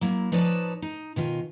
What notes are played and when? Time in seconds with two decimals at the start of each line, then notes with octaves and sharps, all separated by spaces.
0.01 F#3 A#3 E4
0.32 F3 D#4 B4 C#5 D5 A5
0.82 D#4
1.16 B2 D#3 F4 G#5